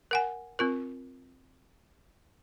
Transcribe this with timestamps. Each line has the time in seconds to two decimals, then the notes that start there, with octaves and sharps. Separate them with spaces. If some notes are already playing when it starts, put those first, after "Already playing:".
0.11 A#4 F#5 G#5
0.59 C4 F4 A#4